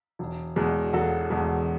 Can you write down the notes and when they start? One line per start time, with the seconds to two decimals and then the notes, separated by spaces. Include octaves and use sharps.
0.19 E1
0.56 E2 B2 G#3
0.93 E1 F#4 A4
1.30 E2 B2 G#3